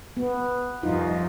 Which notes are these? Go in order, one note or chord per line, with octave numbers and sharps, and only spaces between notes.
B3
C2 F2 D#4 F4